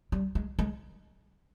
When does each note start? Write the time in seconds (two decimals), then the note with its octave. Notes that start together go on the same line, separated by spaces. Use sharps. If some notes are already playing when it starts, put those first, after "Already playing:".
0.12 G3
0.35 G#3
0.59 G#3